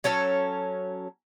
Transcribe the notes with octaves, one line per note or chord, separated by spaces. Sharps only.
F#3 C#4 A4 C#5